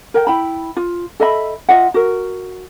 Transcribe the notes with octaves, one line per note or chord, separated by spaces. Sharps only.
A#4 G5
E4 G5 B5
F4
A4 D#5 E5 B5
F4 D#5 E5 F#5
F#4 A#4